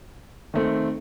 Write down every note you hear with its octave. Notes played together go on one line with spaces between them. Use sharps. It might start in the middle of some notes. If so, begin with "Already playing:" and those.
D#3 A3 C4